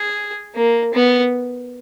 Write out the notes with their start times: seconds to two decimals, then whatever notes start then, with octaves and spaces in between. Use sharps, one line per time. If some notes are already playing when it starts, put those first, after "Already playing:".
Already playing: G#4
0.56 A#3
0.94 B3